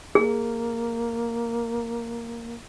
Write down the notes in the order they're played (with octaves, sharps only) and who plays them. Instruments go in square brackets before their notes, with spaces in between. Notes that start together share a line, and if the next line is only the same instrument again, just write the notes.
[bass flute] A#3 [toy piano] G#4